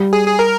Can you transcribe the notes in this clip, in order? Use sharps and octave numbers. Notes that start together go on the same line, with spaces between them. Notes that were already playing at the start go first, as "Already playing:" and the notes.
Already playing: G3
G#4
G#4
A#4